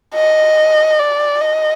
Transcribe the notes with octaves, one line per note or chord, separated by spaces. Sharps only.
D#5
D5
D#5